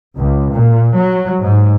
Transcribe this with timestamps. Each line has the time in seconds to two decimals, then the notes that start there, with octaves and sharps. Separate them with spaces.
0.17 C#2
0.55 A#2
0.98 F#3
1.42 G#2